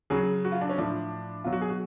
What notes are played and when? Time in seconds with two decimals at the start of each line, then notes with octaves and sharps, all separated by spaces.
0.10 C#3 F#3 G#4
0.45 F#4
0.52 F4
0.61 D4
0.69 C#4
0.78 A2 F3 D4
1.44 B2 F#3 F4
1.53 F#4
1.61 G#4
1.70 F#4